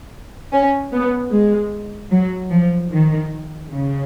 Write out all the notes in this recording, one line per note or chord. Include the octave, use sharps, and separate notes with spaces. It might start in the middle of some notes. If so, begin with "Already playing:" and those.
C#4
B3
G#3
F#3
F3
D#3
C#3